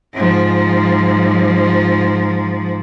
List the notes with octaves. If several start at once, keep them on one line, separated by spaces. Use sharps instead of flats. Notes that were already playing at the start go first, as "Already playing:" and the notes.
G#2 F3